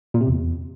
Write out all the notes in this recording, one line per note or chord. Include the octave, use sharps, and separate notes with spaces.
A#2
C3
E2